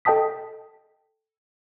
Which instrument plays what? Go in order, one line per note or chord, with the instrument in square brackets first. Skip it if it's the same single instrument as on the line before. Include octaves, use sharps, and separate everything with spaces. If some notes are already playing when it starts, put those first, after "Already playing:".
[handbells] A4 D#5 G5 A5 D#6 B6